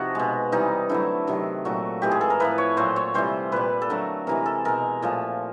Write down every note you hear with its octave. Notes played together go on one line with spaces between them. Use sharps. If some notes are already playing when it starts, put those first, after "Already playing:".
Already playing: C3 F3 D#4 F#4
B2 G#3
C3 E3 G3 D#4
D3 F#3 A3 E4
C3 D#3 F#3
A#2 F#3 A3 F#4
A2 E3 G#3 G4
G#4
A4
A#4
A2 F3 A3 B4
C#5
A#2 F#3 A3 C5
C#5
C3 E3 G3 C5
A#2 G3 B4
A4
D3 F#3 A3 A#4
C3 E3 G#3 A#4
A4
B2 G#3 A#4
A#2 F3 A3